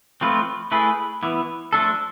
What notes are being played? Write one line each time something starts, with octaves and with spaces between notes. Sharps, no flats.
F3 A3 C4 F4 B4
A3 E4 G#4 B4
E3 B3 E4
F3 A3 D4 A4